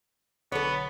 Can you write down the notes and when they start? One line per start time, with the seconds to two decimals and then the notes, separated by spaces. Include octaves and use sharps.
0.52 B1 D3 B3 A4 C#5